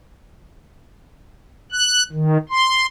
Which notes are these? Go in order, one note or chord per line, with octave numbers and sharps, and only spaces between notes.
F#6
D#3
C6